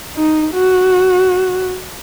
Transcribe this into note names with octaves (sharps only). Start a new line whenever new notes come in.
D#4
F#4